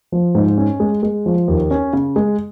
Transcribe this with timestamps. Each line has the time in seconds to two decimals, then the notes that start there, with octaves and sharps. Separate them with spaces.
0.12 F3
0.35 G#2
0.58 C#4
0.80 G#3
1.03 G#3
1.26 F3
1.48 D#2
1.71 C#4
1.93 C#3
2.16 G#3